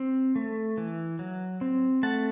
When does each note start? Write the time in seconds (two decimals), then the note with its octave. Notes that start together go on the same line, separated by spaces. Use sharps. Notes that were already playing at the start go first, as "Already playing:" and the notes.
Already playing: C4
0.36 A3
0.78 E3
1.19 F#3
1.61 C4
2.03 A3 F#5 A5